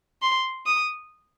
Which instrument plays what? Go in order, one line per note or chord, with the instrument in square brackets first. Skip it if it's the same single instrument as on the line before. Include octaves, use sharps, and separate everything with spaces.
[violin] C6
D#6